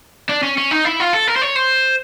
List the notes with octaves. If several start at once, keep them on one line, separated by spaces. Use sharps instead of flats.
D4
C#4
C#4
D#4
E4
F4
A4
A#4
C5
C#5
C5